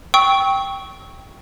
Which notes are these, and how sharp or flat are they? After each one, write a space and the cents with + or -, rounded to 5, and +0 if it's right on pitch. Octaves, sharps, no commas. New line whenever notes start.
G5 +0 C#6 +0 E6 -35